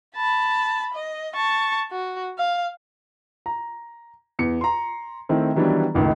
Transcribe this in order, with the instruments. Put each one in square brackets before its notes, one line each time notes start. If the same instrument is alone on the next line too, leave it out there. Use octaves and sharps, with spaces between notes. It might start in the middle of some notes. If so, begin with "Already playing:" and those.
[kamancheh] A5 B5
D#5
A5 C#6
F#4
F5
[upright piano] A#5
E2 C#7
A#5 C6
D#3 A3 C4 E4
D#3 E3 F#3 G3 B3 D4
G#1 C#2 A2 D#4